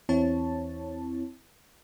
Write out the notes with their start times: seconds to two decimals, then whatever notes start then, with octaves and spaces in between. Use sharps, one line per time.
0.09 E2 C4 E4 C#5 A5